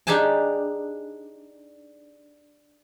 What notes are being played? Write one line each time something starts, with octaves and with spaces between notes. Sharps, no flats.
D4 D#4 G4 G#4 G#5 A5